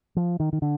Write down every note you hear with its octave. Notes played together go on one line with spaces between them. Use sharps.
F3
D#3
D#3
D3